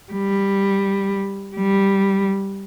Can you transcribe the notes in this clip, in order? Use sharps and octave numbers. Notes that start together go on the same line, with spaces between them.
G3
G3